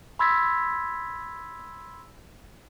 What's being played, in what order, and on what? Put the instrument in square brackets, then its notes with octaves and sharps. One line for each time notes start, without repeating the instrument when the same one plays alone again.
[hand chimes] B5 C6 E6 G#6 A6 B6